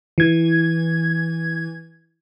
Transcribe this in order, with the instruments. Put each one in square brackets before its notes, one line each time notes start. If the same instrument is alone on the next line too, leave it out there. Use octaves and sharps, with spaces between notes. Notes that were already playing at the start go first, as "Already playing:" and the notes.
[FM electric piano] E3 G#6